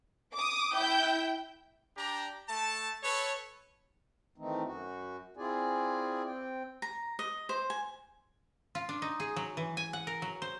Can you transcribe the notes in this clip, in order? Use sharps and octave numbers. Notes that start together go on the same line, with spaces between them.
D6 D#6
E4 G5 G6
D4 G4 A#5
A3 A5
A4 B4 C#5
D#3 E3 A3 C4 D#4
F#2 F#4
C4 E4 F4 G#4 D5 G#5
C4 G5
A#5
D#5
C5
G#5
F4
D4
D#4
G#4
F#3
E3
G#5
F#5
A#4
F#3
C5